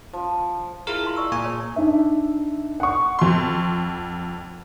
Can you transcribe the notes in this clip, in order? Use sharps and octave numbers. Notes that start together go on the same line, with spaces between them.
F3
E4 F4 G#4 A#4
F5 A5 C6
D5 C#6 E6
A#2 G#4 G#5
C#5 D5 A5
D4 D#4 E5
F#5 C#6
F2 C6